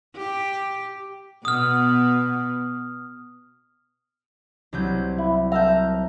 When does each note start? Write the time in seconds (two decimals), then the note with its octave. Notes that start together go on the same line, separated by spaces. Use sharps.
0.17 G4
1.45 B2 B3 D#6 F6
4.73 C2 F#3 G6
5.18 E4
5.52 A#4 E5 A5 G6